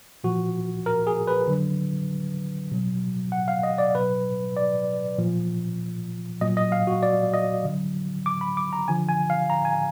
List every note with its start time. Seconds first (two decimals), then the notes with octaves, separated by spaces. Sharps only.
0.24 A#2 F3 F#4
0.86 A#4
1.07 G#4
1.27 B4
1.48 D3 F#3
2.71 B2 F#3
3.32 F#5
3.48 F5
3.63 D#5
3.78 D5
3.95 B2 F#3 B4
4.57 D5
5.18 A#2 F3
6.41 A#2 F#3 D#5
6.57 D#5
6.72 F5
6.87 F#4
7.03 D5
7.34 D#5
7.64 D3 F#3
8.26 D6
8.41 B5
8.57 D6
8.73 A#5
8.88 D3 F3 G#5
9.09 G#5
9.30 F5
9.50 A#5
9.65 G#5